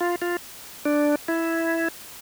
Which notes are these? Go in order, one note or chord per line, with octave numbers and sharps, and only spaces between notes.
F4
F4
D4
E4